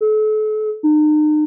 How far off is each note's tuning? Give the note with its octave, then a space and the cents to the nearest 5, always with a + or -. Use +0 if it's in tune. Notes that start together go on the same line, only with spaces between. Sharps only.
A4 -40
D#4 -40